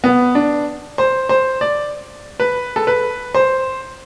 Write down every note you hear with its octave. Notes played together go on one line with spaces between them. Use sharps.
B3
D4
C5
C5
D5
B4
A4
B4
C5